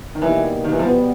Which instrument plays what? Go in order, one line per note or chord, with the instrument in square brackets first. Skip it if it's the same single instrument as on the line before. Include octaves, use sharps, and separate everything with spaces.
[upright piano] D#3
[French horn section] B2 G3 A#3 D#4 G4 [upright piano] E3
[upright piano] D#3
E3
[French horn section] B2 G3 B3 [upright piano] F3